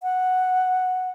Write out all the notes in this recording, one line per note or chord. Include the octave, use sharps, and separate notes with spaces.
F#5